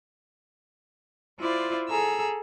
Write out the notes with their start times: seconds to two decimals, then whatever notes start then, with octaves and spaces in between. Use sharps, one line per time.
1.39 E4 F4 C5 D5
1.87 G#4 A4 A#5 E6